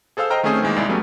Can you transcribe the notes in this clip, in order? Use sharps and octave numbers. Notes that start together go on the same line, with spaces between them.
G#4 A4 C5 F5 E6
C5 D#5 G5 A#5 F6
D#3 A3 C4 C#4 G#4 C5
D#3 E3 G#3 A#3
C2 G#3 E4 D5 A6
F#3 G3 A3 B3 C#4